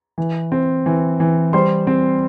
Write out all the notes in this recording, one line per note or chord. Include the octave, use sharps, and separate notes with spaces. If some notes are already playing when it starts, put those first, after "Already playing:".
E3
C4
E3
E3
G3 C5 C6
C4